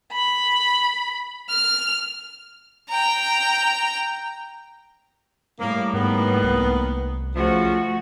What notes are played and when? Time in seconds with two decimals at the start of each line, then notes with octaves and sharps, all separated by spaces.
0.12 B5
1.49 F6
2.89 G5 A#5
5.60 A2 G3 A#3
5.94 G#2 D#3 A#3 B3
6.43 C2
7.35 C#3 F3 A3 F#4